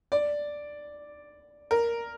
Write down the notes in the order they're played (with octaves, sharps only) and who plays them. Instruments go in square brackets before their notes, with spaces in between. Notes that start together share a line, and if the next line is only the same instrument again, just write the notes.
[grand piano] D5
A#4